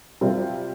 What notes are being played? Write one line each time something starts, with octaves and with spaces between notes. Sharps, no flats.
C3 G3 C4 F4